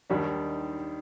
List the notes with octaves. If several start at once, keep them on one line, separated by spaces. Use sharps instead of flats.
D#2 D#3 G3 D4